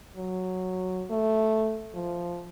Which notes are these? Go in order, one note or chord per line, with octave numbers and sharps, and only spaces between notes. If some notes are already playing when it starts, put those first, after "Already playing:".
F#3
A3
F3